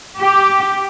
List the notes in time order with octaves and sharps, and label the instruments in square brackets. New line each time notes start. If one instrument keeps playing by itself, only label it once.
[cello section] G4